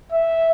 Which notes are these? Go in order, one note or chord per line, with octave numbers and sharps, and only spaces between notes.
E5